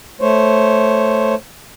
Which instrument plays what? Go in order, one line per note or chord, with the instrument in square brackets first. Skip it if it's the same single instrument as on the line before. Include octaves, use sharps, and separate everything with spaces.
[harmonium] A3 C5 C#5